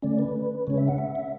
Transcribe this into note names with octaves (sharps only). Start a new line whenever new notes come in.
D3 A3 C#4 D5
B4
C#3 G#3 C#4 C#5
E5
F#5
E5
E5